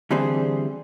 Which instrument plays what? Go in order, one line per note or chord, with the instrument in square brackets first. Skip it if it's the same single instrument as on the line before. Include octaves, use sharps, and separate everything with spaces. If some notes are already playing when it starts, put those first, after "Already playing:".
[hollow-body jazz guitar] D3 E3 G3 C4 G#4 C5